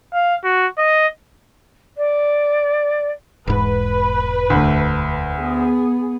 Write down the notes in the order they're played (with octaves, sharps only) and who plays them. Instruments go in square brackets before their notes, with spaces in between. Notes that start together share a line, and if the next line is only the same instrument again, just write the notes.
[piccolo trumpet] F5
F#4
D#5
[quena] D5
[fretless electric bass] E1 G#2 [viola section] B4
[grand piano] D2 A3
[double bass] B3 [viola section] G#4